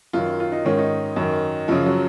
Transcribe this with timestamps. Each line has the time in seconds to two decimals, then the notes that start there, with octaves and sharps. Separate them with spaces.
0.13 F#2 D#3 F4
0.40 F4
0.52 D#4
0.65 G#2 D#3 C#4
0.78 D#4
1.16 F#2 D#3
1.68 F#2 C#3 F3
1.86 F#3